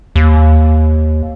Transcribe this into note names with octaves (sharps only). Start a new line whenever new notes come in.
D#2